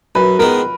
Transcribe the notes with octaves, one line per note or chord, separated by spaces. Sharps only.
F#2 B4
D#3 G#3 B3 A#4